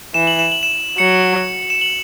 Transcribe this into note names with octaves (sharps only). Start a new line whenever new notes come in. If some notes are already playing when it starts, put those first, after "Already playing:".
E3 E7
F#7
E7
F#7
E7
F#3 C#7
E7
F#7